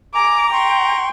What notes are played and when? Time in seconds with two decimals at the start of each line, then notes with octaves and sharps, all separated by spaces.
0.15 G#5 A#5 D6
0.53 G5 C6 C#6